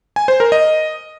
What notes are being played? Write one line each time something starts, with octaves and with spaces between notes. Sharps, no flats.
G#5
C5
A#4
D#5